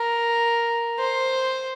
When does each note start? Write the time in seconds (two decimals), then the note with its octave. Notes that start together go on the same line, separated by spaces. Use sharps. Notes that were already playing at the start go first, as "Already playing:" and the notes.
Already playing: A#4
0.99 C5